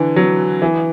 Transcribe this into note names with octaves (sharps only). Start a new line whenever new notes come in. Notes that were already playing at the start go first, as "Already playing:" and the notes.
Already playing: D3 E3
F#3
E3